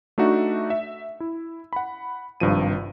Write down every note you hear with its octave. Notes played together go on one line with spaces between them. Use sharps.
A3 D4 D#4 F#4 E5
E5
E4
F#5 B5
G#1 G2 C3 F3 D#7